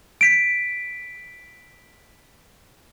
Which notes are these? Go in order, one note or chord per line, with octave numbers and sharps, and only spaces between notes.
B6 D7